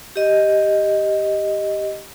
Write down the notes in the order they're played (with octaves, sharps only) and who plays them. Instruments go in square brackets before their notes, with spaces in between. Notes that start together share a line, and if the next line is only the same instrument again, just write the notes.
[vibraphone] G4 D#5